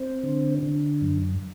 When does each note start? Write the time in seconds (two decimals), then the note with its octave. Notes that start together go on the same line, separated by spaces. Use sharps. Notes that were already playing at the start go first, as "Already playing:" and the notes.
Already playing: C4
0.23 D3
0.63 D3
1.01 F#2